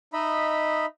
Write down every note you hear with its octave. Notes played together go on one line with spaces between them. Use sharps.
D#4 D#5 E5 B5